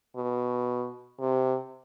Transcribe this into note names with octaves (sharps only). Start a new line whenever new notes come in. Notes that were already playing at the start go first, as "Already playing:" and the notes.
B2
C3